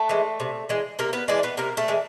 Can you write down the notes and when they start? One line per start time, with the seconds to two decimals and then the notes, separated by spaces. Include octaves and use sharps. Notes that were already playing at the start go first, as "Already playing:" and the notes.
Already playing: A3 A4
0.09 E3 G#3
0.40 C3
0.69 E3 G#3
0.99 C3 A#3 A#4
1.13 B3 B4
1.28 E3 G#3 D4 D5
1.43 B3 B4
1.57 C3 A#3 A#4
1.77 A3 A4
1.88 E3 G#3